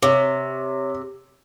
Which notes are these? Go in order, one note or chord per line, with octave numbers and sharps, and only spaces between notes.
C3 C#5